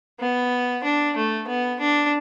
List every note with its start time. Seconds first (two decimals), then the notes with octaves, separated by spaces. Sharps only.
0.20 B3
0.84 D4
1.16 A3
1.47 B3
1.80 D4